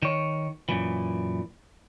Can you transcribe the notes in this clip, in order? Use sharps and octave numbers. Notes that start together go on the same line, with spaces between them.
D#3 C#5
F#2 A#2 E3